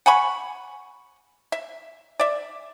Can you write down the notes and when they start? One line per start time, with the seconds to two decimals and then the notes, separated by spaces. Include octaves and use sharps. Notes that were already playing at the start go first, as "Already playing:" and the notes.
0.06 F#5 G#5 B5 C#6
1.52 E5
2.20 D5 E5